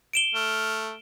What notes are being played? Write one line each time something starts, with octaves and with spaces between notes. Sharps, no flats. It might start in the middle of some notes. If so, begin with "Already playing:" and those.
D7 E7 G7
A3 F6